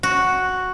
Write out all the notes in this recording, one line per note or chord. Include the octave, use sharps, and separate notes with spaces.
F#4